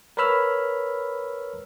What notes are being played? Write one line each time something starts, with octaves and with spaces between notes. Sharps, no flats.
A#4 B4 C#5 B5 E6 F6